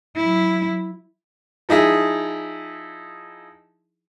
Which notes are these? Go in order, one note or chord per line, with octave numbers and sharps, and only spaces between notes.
F#3 E4
F3 D#4 E4 G#4